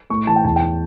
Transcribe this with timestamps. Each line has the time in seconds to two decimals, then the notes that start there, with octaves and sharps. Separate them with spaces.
0.10 A2 C#6
0.27 E3 A5
0.36 G5
0.44 E2 A5
0.56 G5
0.62 E3